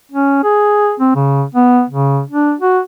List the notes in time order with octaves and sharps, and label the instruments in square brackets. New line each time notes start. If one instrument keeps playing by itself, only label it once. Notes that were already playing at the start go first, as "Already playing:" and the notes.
[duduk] C#4
G#4
C4
C#3
B3
C#3
D4
F#4